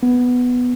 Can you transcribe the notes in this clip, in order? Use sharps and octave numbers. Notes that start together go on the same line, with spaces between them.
B3